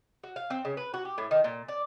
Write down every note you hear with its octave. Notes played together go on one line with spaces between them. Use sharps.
F#4
F5
C4
C#3
B4
F#4
G4
A2
D#3
A#2
D5